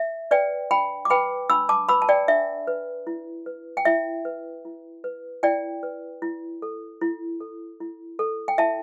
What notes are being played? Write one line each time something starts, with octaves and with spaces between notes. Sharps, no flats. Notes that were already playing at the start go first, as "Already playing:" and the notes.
Already playing: E5
B4 D5 G5
D4 G5 B5
D6
B4 G5 B5
D4 B5 E6
A5 D6
B4 B5 E6
A5
D5 G5
D4 E5
B4
E4
B4
G5
E4 E5
B4
E4
B4
E4 D5 G5
B4
E4
A4
E4
A4
E4
A4
G5
E4 E5 A5